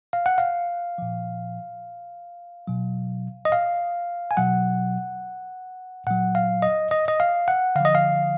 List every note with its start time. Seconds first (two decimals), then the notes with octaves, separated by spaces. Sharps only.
0.13 F5
0.26 F#5
0.38 F5
0.98 A#2 F3
2.67 B2 F#3
3.45 D#5
3.52 F5
4.31 G#5
4.37 B2 F#3 F#5
6.07 A#2 F#3 F#5
6.35 F5
6.62 D#5
6.91 D#5
7.08 D#5
7.20 F5
7.48 F#5
7.75 D3 F5
7.80 F3 D#5
7.95 F5